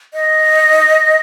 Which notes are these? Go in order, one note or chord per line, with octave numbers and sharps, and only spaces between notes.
D#5